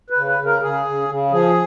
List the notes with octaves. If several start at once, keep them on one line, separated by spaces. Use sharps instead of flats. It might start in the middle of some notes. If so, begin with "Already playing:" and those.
B4
C#3
B4
C#3
A#4
C#3 G#4
C#3
C#3
F3 G#4